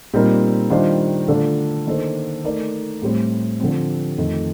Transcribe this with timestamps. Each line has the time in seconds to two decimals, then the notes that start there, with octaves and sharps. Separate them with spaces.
0.14 A#2 G3 C4 D#4 A#4
0.70 D#3 G3 D4 F4 C5
1.28 D3 A3 D4 F4 A4
1.87 D#3 A#3 D4 A4 C5
2.44 A3 D#4 A#4 D5
3.02 A2 G3 C4 G4 C5
3.60 D3 F3 C4
4.18 F2 D#3 A3